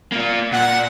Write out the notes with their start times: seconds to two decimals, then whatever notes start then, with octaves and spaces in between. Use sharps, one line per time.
0.12 A#3 F4
0.52 A#2 F#5